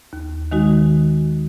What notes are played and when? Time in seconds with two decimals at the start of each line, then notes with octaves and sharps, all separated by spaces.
0.13 D#2
0.52 D#3 G#3 D#4 F#4